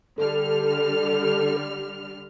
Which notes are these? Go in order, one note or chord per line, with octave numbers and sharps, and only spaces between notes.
D3 G3 A4 F6